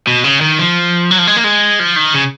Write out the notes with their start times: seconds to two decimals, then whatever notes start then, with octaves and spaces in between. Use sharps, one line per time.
0.07 B2
0.24 C#3
0.41 D#3
0.59 F3
1.11 F#3
1.18 F3
1.27 G#3
1.37 A#3
1.44 G#3
1.80 F3
1.96 D#3
2.14 C#3